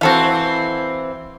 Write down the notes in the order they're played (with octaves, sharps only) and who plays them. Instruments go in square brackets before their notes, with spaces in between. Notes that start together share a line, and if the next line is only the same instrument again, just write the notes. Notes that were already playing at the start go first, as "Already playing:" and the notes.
[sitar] E3 C4 [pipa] F#4 A4 F5